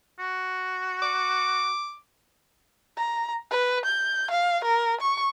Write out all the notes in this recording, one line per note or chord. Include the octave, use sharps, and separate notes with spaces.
F#4
D6
A#5
B4
G6
F5
A#4
C#6